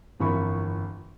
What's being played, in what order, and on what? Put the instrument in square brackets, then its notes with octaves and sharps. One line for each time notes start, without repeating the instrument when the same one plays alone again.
[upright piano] G1 F2 E3 A#3 B5 C#6